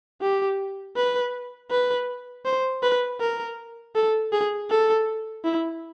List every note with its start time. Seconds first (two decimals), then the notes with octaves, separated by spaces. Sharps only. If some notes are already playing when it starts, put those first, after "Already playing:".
0.22 G4
0.96 B4
1.71 B4
2.45 C5
2.83 B4
3.20 A#4
3.95 A4
4.32 G#4
4.70 A4
5.44 E4